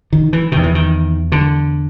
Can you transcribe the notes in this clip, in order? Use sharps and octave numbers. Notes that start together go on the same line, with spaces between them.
D#3
E3
E2 C3 D#3
E3
D#3
D3